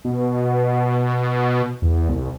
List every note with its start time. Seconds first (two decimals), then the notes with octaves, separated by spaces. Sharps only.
0.04 B2
0.73 B2
1.82 E2
2.09 C2